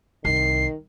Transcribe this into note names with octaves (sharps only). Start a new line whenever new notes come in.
C2 D#3 C7